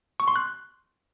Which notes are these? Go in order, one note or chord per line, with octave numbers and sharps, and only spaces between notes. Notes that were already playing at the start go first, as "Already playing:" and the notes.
C#6
C6
F#6